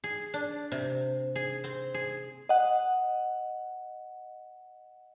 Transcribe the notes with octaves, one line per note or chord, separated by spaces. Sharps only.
G#4
D4
C3
G#4
C4
G#4
D#5 F#5